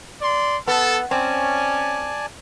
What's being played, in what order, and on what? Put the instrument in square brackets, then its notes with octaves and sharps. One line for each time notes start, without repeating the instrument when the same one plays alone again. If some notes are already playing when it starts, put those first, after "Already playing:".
[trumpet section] D5 C6
[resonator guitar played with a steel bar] B3 [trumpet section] A4
[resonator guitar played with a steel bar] C4 [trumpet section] C#4 [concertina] D5 G#5 A5